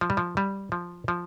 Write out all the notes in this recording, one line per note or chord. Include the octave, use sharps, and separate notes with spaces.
F3
G3
F3
G3
F3
F3